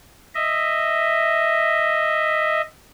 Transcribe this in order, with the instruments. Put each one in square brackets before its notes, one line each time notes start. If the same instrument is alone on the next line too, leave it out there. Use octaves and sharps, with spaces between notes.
[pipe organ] D#5 E5